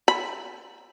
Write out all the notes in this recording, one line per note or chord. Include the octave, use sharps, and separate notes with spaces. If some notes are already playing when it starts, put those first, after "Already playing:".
B5